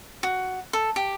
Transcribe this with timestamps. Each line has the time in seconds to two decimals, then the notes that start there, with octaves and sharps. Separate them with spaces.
0.23 F#4
0.73 A4
0.96 G4